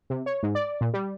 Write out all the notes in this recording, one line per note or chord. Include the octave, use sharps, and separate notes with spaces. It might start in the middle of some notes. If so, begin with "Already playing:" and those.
C3
C#5
G#2
D5
A#2
G3